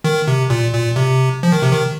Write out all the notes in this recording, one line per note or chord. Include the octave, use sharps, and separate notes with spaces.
D#3
C3
A#2
A#2
C3
F3
D#3
C3
D#3